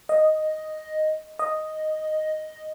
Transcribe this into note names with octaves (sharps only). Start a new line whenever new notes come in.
D#5
D#5